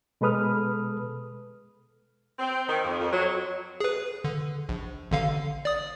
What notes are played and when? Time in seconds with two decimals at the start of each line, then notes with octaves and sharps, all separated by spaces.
0.21 B2 G#3 A4 B4 D#6 F6
2.38 C4
2.68 D#3
2.83 F2
2.98 F2
3.12 F#3
3.80 G#4 B4
4.24 D3
4.69 A#1
5.11 A1 D3 F5
5.65 D5 D#6